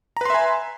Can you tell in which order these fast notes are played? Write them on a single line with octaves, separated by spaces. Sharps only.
A#5 B4 C6 E5 G#5